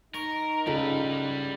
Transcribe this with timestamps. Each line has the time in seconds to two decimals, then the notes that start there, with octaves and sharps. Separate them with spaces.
0.14 D#4 A#4 C#6
0.67 C#2 G3 F4 A4 B4